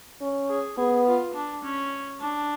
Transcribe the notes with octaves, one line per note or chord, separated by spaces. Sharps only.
C#4
G#4
B3 G#4
F4
D4
C#4
D4